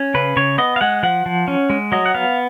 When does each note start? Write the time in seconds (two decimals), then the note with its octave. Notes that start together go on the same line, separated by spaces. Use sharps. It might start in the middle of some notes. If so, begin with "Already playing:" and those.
Already playing: C#4
0.14 C#3 B4
0.36 C#3 C#5
0.58 B3 D#5
0.76 F5
0.81 G#3 F#5
1.03 F3 F#5
1.26 F3
1.48 C#4
1.70 G#3
1.92 F#3 D#5
2.06 F#5
2.14 B3 F5